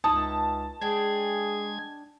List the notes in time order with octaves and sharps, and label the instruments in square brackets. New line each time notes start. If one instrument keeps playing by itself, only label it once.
[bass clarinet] C#2 [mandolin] D#4 E4 D#6 [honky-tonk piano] A5
[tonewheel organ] G#3 G#6 [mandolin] D4 G5 [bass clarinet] G#4